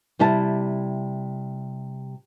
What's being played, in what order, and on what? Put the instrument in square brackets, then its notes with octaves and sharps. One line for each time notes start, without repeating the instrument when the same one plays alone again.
[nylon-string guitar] C3 G3 E4 A5